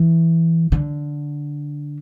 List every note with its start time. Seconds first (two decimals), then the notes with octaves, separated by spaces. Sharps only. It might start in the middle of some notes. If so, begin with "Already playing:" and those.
Already playing: E3
0.72 D3